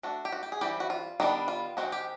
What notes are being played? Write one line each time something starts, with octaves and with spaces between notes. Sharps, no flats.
A3 D4 F#4
G4
F#4
G4
G#4
E3 G3 C4 G4
F#4
F4
D#3 G3 B3 D4 F#4
F4
D#3 G#3 C4 D#4 F#4
G4